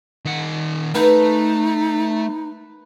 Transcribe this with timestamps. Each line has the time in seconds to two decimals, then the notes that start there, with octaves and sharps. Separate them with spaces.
0.25 D#3 F#5
0.95 A3 D#4 B4